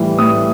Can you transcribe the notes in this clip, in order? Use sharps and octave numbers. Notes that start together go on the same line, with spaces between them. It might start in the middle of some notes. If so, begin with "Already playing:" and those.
Already playing: A2 E3 G3
A2 D#6